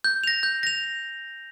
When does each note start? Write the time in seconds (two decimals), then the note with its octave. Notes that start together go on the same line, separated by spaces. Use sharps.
0.04 G6
0.24 A#6 F7
0.43 G6
0.63 A#6 F7